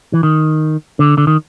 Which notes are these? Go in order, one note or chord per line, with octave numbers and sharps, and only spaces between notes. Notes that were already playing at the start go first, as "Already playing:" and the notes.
E3
D#3
D3
D3
D#3